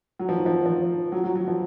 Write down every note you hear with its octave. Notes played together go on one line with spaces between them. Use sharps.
F#3
F3
D#3
F3
F3
F#3
F#3
F#3
F3